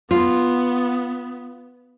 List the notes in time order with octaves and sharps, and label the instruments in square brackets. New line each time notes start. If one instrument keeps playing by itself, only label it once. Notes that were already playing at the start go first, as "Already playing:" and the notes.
[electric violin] B3 [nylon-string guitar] F4